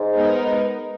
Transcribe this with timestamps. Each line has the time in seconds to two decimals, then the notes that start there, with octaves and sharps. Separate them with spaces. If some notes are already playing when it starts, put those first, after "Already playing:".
Already playing: G#2
0.14 G#3 B3 D#4 A#4